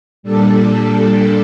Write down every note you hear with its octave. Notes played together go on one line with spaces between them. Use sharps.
A#2 G3 D4 A4